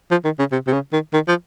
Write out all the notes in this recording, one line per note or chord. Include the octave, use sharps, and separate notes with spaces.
F3
D#3
C#3
C3
C3
C#3
D#3
D#3
F3